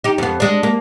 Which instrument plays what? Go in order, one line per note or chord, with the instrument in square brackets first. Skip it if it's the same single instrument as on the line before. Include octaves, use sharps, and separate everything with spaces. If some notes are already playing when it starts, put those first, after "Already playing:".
[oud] D#4 G4
F2 B3
G#3 D4
A#3